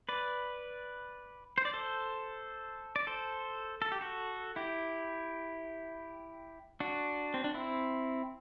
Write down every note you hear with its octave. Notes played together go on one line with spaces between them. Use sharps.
B4 D5
C5
D5
A4 C5
D5
A4 C5
A4
G4
F#4 A4
E4 G4
D4 F#4
C4
D4
C4 E4